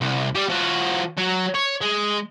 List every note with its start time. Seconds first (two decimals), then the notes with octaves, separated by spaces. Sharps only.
0.01 C2
0.35 G3 G4
0.50 F3 F#4
1.18 F#3
1.55 C#5
1.81 G#3